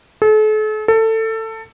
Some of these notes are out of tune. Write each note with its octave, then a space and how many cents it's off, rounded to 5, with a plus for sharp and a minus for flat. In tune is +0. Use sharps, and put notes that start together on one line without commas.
A4 -40
A4 +20